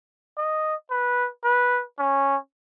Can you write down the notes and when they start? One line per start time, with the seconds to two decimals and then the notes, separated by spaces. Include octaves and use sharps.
0.37 D#5
0.90 B4
1.44 B4
1.99 C#4